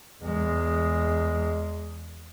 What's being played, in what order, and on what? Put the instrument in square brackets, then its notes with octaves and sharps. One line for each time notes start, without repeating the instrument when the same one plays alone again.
[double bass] E2 G#3